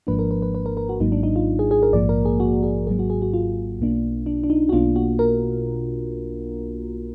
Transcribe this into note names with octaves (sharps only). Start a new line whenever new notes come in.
G#1 G#2 F3 A#3 D4 B4
A#4
B4
B4
B4
A#4
A#4
F#4
G#1 G#2 F#3 A#3 D#4
D4
D#4
F4
G#4
G#4
A#4
A#1 G#2 F3 A#3 D5
A#4
G#4
F#4
G#4
G#1 G#2 F#3 A#3 G#4
F#4
G#4
F#4
F4
B1 B2 A#3 D4
D4
D4
D#4
F#4
B1 B2 A#3 D4 F4
F#4
A#4